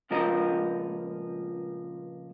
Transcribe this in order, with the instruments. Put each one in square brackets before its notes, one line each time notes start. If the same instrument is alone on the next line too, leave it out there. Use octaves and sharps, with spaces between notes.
[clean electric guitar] C#2 A#2 F3 A#4 D#5 A#5